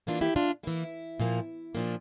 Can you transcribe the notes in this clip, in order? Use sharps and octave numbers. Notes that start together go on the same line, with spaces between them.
E3 A#3 D4 F4
E4 G4
D4 F4
E3 A#3 E4
A#2 F3 A#3
A#2 F3 A#3 D4